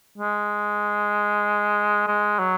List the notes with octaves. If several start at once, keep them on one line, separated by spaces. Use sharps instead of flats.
G#3
G#3
F#3